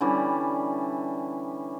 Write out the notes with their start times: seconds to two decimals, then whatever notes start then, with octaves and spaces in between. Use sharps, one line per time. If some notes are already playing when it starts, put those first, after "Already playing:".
0.01 D3 E3 G3 C#4